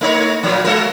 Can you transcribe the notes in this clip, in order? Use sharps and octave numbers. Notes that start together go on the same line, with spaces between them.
A3 D#4 C#5
A#2 F3 A#3
G#3 F#4 A#4